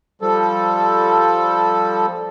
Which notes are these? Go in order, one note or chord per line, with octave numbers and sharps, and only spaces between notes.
F3 G3 A4